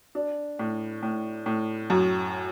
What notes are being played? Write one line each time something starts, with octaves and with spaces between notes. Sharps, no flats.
D4
A2
A2
A2
F#2